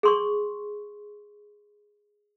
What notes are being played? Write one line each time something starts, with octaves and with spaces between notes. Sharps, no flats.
G#4 C6 C#6